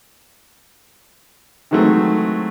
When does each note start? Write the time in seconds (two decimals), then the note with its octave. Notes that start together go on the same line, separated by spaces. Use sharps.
1.71 D#3 E3 F#3 G#3 A3 C4